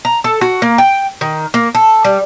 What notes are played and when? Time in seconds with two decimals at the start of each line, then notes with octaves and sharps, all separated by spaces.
0.05 A#5
0.24 A4
0.41 F#4
0.62 A#3
0.78 G5
1.21 D#3
1.54 A#3
1.75 A4
2.05 G3